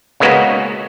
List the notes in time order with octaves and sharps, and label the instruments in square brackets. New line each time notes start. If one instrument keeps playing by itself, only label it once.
[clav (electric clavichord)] C#3 G#3 A#3 B3 C#4 F#4